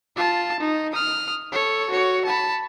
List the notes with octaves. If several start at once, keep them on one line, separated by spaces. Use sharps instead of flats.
F4 A5
D#4
D#6 F6
A4 C#5
F#4 C#5
A5 B5